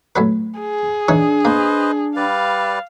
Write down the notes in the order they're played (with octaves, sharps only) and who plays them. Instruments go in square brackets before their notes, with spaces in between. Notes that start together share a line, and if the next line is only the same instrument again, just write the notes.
[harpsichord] A2 F#3 B4
[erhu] G#4
[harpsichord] E3 D#4 C#5 [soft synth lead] D4
[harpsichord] A#3 [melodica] B4 C5 D#5
[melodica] G3 B4 D5 [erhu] F5